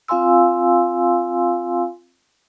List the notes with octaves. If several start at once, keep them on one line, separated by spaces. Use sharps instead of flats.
C4 F4 F5 G#5 C6 E6